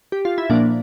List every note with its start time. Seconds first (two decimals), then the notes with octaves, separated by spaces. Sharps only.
0.12 G4
0.25 F4
0.38 E4
0.49 A#2 F3 A#3 D4